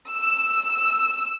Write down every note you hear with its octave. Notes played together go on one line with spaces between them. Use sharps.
E6